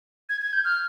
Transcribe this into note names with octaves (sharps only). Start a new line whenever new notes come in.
G#6
G#6
G6
F6